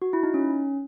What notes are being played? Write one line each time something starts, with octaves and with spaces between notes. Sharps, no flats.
F#4
E4
D#4
C#4